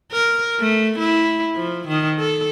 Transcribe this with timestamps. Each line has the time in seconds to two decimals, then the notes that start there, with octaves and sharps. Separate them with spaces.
0.12 A#4
0.60 A3
0.99 E4
1.56 F3
1.88 D#3
2.19 A4